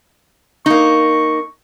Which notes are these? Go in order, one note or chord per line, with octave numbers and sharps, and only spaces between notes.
A#3 D#4 C#6